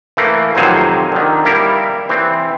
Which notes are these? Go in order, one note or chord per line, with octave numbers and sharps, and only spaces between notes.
E3 A3 A#3
F2 C3 D#3 F#3 C5 G#5
D3 D#3
G3 A#3 E4 A#4
E3 C4